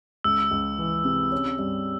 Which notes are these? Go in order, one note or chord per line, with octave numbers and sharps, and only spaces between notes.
C#2 E6
C#2
E3
C3
C#4
G2